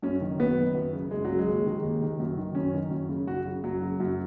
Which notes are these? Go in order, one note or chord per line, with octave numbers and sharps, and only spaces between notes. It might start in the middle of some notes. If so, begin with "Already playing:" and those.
F#2 C#4
D#3
F#2 B3
D#3
F#2
C#3
F#2 G#3
F#3
C#3
G#3
D#2
D#3
D#2
D#3
F#2
D#3
F#2 C#4
D#3
F#2
C#3
F#2 F#4
C#3
F#2 F#3
C#3
F#2